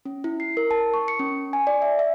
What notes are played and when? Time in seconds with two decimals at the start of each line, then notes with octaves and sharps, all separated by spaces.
0.05 C#4
0.24 E4
0.40 C7
0.57 A#4
0.71 A5
0.94 C#6
1.08 C#7
1.19 C#4
1.53 G#5
1.67 D5
1.82 E5
1.99 E5